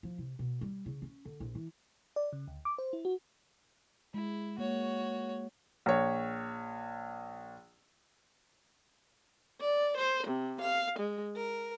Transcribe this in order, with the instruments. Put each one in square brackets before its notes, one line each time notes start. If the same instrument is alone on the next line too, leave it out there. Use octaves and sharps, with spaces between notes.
[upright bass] F3
C3
B2
G3
C#3
C#4
D3
A#1
E3
[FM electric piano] D5
C#3
D2
D6
C5
E4
F#4
[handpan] G#3 [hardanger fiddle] E4
[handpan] A#3 [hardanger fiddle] F#4 C#5
[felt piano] A#1 C#5
[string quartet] D5
C5
C3
F5
G#3
A#4